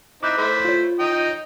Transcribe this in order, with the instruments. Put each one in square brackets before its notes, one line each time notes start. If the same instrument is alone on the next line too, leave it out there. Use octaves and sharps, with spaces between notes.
[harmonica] C4 D#4 E4 [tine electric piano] D6 F#6 G6
[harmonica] A3 E4 C5
[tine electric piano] F4 C#5
[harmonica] D#4 D#5 G5